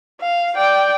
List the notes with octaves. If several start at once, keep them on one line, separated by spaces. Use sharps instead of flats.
F5
D5 G5